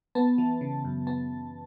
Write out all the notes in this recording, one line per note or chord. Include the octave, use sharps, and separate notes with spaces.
B3 A5
E3
C#3
F#2
B3 A5